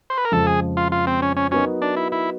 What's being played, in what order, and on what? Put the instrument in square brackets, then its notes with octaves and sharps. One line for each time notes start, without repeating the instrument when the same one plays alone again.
[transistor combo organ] C5
B4
A#4
[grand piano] F2 C#3 F3 G#3 [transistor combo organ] A4
[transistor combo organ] G#4
F4
F4
C4
C#4
C#4
[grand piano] F#3 B3 D#4 F#4 A#4 [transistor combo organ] C#4
[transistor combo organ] D4
E4
E4